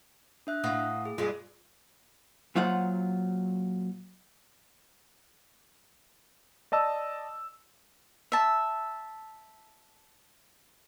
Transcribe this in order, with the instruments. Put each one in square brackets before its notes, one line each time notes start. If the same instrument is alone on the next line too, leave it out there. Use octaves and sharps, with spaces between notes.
[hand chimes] D4 E5 F#6
[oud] A2 [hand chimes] F5 F#5 D#6
[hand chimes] G#4
[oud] G2 G#3 [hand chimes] F4
[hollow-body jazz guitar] A#2 F#3 F4 C5 F#5
[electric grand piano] D5 D#5 A5 E6
[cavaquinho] E5 A5